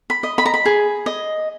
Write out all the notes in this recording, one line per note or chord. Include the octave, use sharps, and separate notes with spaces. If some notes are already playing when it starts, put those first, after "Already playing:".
B5
D#5
B5
A#5
B5
G#4
D#5